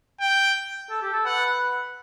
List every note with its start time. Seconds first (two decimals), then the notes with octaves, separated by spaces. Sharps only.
0.21 G5
0.90 A4
1.02 G4
1.13 A4
1.25 B4 F#5